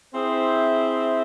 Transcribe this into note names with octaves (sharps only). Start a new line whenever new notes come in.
C4 E4 G#4 C5 E5